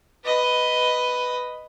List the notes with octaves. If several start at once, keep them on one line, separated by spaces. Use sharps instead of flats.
B4 D#5